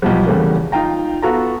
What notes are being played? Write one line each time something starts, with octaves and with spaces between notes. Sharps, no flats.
B1 F3 G3
E2 C#3 G3 A3 A#3
D#4 F4 F5 G5 A#5
B3 F4 F#4 A4 A#5